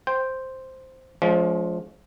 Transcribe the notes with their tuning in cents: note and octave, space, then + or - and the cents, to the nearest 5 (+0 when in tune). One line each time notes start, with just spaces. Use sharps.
C5 +0 G5 +0
F3 +0 G#3 +35 C#4 +40